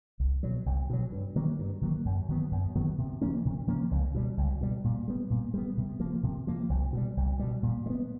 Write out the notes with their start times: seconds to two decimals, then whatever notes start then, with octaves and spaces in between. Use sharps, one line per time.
0.20 C2
0.43 B2 F#3
0.66 C2
0.90 B2 F#3
1.12 G2
1.36 D#3 F#3 A#3
1.59 G2
1.81 D#3 F#3 A#3
2.05 F#2
2.29 D#3 F#3 B3
2.51 F#2
2.75 D#3 F#3 B3
2.98 C3
3.21 F3 A#3 C#4
3.45 C3
3.67 F3 A#3 C#4
3.91 C#2
4.14 B2 G3
4.37 C#2
4.61 B2 G3
4.84 A#2
5.08 G3 B3
5.30 A#2
5.54 G3 B3
5.77 C3
6.00 F3 A#3
6.23 C3
6.47 F3 A#3
6.69 C2
6.93 B2 G3
7.17 C2
7.39 B2 G3
7.63 A#2
7.86 G3
7.90 B3